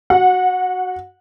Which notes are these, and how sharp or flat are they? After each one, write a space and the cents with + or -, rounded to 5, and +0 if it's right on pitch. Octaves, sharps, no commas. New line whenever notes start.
F#4 +5 F#5 -20